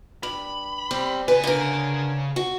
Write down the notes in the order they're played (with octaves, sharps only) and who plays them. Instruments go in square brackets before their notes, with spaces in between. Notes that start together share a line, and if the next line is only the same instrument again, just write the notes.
[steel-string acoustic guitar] G2 [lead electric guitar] B5
[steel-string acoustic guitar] G3 C4
[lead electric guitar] C#3 G#5 [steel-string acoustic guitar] B4
[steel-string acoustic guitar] D3 A#4
F#4